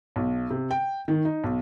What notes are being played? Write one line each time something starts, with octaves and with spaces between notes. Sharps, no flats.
B1
C3
G5
D#3
D#4
B1